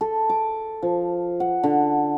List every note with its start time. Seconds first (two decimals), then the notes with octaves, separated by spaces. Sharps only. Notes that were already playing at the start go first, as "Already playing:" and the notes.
0.01 A4
0.29 D6
0.82 F3
1.40 F#5
1.63 D3